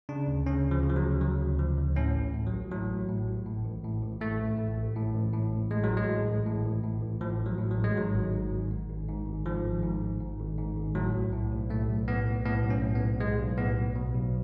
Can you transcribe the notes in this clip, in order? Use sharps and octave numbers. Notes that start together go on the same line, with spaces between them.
C#3 D4
D2
C#3 C#4
D2
F3
C#3
F3
F#3
D2
C#3 F#3
D2
C#3 F3
D2
A2 C#4
A1
A2
F#3
A1
A2 F#3
A1
A2
A1
A2
A1
A2
A1
A2 A3
A1
A2
A1
A2
A1
A2
A1
A2 G#3
F#3
A1
G#3
A2
A1
A2
A1
A2
A1
A2 F3
A1
F#3
A2
F#3
A1
G#3
G#2 F#3
G#1
G#2
G#1
G#2
G#1
G#2
G#1
G#2 F3
G#1
G#2
G#1
G#2
G#1
G#2
G#1
A2 F#3
B1
A2
B1
A2 A3
B1
A2 B3
B1
A2 B3
B1
C#4
A2
B3
B1
A2 G#3
B1
A2 B3
B1
B2
B1